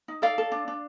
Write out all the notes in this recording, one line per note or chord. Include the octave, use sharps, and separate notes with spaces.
D#4
A4 D5 F5
A4
D4
D4